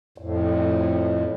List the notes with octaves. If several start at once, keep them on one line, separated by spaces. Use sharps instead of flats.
F2 A2